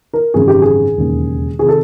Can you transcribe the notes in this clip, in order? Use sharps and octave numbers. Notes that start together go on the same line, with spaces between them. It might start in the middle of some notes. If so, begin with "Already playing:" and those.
A#4
G#1 F#2 C#3 E3 G#4
G4
G#4
E1 D#2 C#3
C3 D#3 G#4
A4